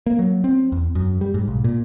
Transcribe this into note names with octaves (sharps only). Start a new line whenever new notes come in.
A#3
F#3
C4
E2
F#2
G3
G#2
B1
A#2